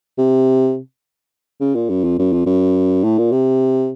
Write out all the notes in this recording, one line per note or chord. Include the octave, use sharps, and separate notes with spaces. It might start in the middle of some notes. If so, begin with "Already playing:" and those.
C3
C#3
A#2
F#2
F2
F#2
F2
F#2
A2
A#2
C3